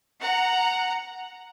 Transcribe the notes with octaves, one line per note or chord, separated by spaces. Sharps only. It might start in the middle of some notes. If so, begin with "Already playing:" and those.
F#5 A#5